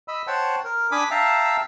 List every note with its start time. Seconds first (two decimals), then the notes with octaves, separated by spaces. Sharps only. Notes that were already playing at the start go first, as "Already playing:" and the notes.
0.08 D#5 B5 E6
0.27 C5 C#5 F#5 G5 A5
0.64 A#4
0.92 D4 G#5 B5 D6 D#6
1.11 E5 F5 G5 A5 A#5 E6